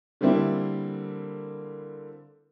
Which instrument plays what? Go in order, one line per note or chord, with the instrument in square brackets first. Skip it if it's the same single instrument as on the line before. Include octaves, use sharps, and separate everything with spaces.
[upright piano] D3 G3 A#3 C4 E4